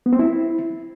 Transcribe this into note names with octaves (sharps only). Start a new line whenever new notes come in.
B3
C4
E4